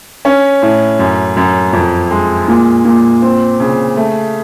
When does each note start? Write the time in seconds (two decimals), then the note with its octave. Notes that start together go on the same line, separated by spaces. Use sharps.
0.25 C#4
0.62 A2
0.99 F#2
1.37 F#2
1.73 F2
2.11 G#3
2.48 A#2
2.85 A#2
3.22 C4
3.60 C#3
3.97 A3